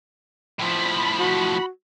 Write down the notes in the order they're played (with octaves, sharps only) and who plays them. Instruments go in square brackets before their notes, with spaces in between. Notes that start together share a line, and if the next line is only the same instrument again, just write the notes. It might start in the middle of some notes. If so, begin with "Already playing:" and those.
[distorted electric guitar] A2 F3 [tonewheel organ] B5
[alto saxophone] F#4